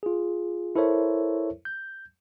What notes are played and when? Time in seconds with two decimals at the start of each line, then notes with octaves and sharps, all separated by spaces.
0.03 F4 G#4
0.76 E4 A4 A#4 C5 C#5 E5
1.65 G6